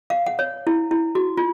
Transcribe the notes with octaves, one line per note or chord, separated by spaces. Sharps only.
F5
F#5
C#5
E4
E4
F#4
F4